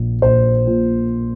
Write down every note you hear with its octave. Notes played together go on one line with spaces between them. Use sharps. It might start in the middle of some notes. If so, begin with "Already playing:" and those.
Already playing: A#1 A#2
A#1 C5
A#2